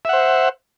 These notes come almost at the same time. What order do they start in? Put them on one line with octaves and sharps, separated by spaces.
E5 F#5 C5